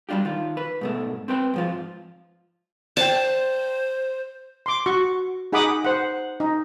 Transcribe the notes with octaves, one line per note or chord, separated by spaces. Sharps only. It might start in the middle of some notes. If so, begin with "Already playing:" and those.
G3 A3 D4 F4 G4
D#3 F4
B4
G#2 B2 A3
C4 B4 G5
G#2 F3 F4
C5 D5 G5 A5
C6 D6
F#4 C#6
D#4 G#4 F#5 B5 D6 D#6
C5 F#5
D#4